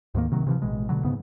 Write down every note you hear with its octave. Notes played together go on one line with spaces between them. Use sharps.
D2 G#2 D#3 A#3
C3 D#3 F#3
C3 E3 F3
A1 B2 G#3
B2 D3 F#3
D2 G#2 C#3 B3